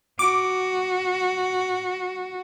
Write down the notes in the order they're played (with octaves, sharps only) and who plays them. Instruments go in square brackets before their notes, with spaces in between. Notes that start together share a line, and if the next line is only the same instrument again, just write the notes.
[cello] F#4 [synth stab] D6